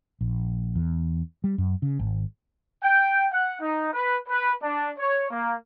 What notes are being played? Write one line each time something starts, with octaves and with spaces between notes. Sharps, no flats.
A#1
E2
G3
F#2
C#3
G#1
G5
F#5
D#4
B4
B4
D4
C#5
A#3